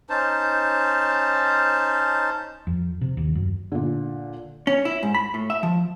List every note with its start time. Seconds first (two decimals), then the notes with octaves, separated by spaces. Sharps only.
0.09 C#4 D#4 C5 A5
2.67 F2
3.01 C3
3.17 D#2
3.35 F#2
3.72 A#2 D3
4.67 C#4
4.85 E4
5.03 G#2
5.14 B5
5.34 A2
5.50 E5
5.63 F3